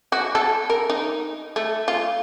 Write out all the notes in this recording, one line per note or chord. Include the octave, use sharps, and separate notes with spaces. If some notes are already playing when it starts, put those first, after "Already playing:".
F#4
A4
A#4
D#4
A3
F4